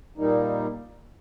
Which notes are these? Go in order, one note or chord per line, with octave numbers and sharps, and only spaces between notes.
A#2 G3 A#3 D#4